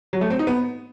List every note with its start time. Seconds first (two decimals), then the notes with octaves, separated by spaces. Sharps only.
0.13 F#3
0.21 A3
0.30 C4
0.39 D#4
0.47 B3